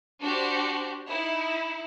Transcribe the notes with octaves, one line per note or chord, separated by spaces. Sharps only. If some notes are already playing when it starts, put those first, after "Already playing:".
D4 F#4 G4 C5
D#4 E4